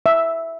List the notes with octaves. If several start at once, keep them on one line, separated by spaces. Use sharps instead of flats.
E5